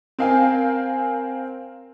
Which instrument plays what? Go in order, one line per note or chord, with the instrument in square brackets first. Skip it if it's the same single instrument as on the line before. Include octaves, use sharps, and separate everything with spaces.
[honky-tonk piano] C4 A#4 F5 G5 G#5